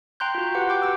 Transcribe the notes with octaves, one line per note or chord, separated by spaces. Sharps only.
G5 A#5 C6 F#6 G6
F4 F#4
G4 B4 F#5
G5 D6 G6
F#4 D6 E6